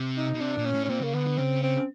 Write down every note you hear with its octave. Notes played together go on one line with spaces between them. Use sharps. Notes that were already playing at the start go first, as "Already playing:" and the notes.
Already playing: C3
D#4
B2
C3 D4
A#2
C#4
A2
C#4
A#2 C4
C#3 A#3
D3 B3
D3
C#3 C4
C4